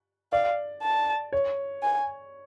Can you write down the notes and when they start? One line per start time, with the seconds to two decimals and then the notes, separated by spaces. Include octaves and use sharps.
0.32 D5 F5
0.82 A5
1.33 C#5
1.83 G#5